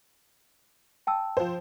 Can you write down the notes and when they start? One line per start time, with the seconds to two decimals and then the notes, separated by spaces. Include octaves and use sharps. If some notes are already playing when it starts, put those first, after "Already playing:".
1.07 G5 A5 E6
1.37 F3 C5